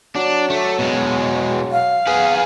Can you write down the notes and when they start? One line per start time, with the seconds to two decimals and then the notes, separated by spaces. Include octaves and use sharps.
0.16 F#3 D4
0.50 A3
0.78 B2 G#3
1.71 F5
2.07 B3 G#4 B4